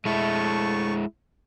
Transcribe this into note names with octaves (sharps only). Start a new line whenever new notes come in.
G#3 A3 E4 A5 C#6